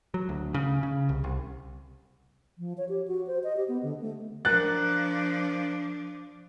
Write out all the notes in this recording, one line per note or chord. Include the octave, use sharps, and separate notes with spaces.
F#3
D2
C#3
C#3
C2
C2
F3
C#5
G4
F#4
C5
D#5
G4
B3
D3
A3
F3 D4 A#4 F#6 A6